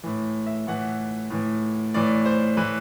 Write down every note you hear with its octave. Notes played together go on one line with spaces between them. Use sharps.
A2 E3
E5
A2 E3 F#5
A2 E3
A2 E3 D5
C5
A2 E3 B4